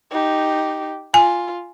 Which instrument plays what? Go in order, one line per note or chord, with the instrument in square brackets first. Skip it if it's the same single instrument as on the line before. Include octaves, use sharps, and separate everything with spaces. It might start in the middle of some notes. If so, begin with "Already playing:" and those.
[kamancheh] D#4 G4
[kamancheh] F4 [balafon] G#5